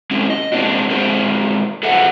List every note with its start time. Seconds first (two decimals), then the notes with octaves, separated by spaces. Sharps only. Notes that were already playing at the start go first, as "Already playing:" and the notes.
0.11 G#3 C4 C#4 G4
0.30 D#5
0.52 G#3 A#3 C4 D4 E4 F#4
0.90 G#3 C4 F4 G#4 A#4 C5
1.83 G#4 A4 B4 D#5 E5 F#5